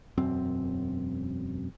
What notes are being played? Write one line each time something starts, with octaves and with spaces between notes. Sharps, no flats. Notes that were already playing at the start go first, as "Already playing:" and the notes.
E1 F#2 C4